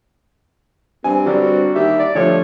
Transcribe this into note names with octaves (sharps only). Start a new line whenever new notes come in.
G2 C4 G#5
D3 F#3 G3
F#4
D#2 G4 E5
D5
G1 D3 F3 A3 C#5